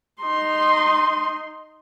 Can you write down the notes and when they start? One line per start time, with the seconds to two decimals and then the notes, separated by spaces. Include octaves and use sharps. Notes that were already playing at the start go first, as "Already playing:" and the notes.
0.21 D#4 C6